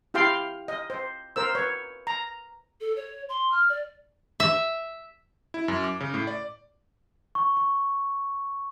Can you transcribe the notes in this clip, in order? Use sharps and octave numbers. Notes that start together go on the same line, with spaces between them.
E4 G4 F5 G5 C6
D#5
C5
A#4 C5 E6
B4 C#5
A#5
A4
C#5
C6
F6
D5
E5
E4
F#2
D6
C#3
A2
D5
C#6
C#6